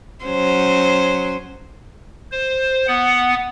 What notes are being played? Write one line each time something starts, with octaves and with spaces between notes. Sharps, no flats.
F#3 C#4 C5
C5
B3 F#5